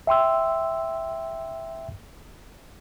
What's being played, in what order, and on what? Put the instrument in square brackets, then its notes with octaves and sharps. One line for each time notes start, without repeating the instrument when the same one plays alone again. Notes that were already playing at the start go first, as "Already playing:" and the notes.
[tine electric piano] E5 G5 C6 E6